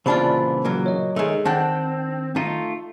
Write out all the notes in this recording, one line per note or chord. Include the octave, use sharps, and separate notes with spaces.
C2 A#2 C#3 E3 D4 F4 C5 B5
F#3 A#3
C#5 D#5
D#3 G#3 A3
D#3 C4 D4 F#5 G5
A3 D#4 F4